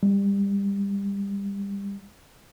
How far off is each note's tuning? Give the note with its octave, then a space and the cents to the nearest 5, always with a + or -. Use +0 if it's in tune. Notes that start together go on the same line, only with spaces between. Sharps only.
G3 +25